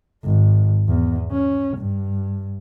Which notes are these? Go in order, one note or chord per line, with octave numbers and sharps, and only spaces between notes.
G#1
E2
C#4
G2